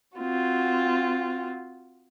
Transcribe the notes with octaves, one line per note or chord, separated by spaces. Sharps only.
C4 F4 F#4